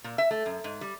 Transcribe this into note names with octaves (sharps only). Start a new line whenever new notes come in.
A#2
E5
A3
F#2
G#2
G3